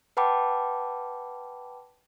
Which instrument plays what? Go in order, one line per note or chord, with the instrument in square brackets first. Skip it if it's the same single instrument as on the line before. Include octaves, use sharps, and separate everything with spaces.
[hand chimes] B4 F#5 G5 A5 B5 D6